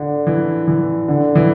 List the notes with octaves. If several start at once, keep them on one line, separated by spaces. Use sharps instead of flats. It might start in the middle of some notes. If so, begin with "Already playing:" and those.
Already playing: D3
E3
E3
D3
E3